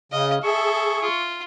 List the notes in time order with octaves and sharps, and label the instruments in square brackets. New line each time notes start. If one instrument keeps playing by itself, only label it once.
[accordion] C#3 [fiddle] D#5 [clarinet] F5
[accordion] G#4 [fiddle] A4 E5 [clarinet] C#6
[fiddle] F4